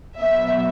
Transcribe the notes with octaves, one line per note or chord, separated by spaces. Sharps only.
B2 F#3 B3 E5